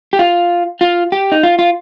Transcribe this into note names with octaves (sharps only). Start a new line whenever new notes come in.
G4
F4
F4
G4
D#4
F4
F4